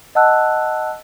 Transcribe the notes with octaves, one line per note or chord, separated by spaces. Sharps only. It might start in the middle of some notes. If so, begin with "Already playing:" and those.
D#5 F#5 A5 E6 F#6